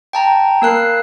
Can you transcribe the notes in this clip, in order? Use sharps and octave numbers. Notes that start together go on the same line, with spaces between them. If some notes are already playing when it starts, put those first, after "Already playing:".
G5 A5 A#5
A#3 A#4 F#6 C7